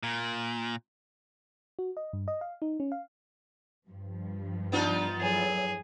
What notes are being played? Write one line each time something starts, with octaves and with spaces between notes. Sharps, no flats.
A#2
F#4
D#5
G2
D#5
F5
D#4
C#4
F5
G2 F3
B3 D4 D#4 F4
E2 A2 F#3 G#4